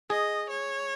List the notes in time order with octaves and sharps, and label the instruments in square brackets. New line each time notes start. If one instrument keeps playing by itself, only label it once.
[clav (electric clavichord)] G#4 [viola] D#5
[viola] C#5